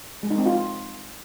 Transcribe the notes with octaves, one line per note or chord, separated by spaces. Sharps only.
G#3
D#4
C4
F4